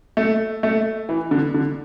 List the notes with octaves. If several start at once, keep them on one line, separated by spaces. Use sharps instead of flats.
A3
A3
E3
D3
D3